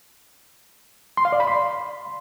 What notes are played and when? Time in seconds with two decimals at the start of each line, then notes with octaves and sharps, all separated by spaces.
1.17 C6
1.25 F5
1.32 D5
1.40 B5
1.48 C6